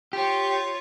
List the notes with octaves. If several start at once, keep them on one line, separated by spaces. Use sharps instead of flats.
F4 G4 C#5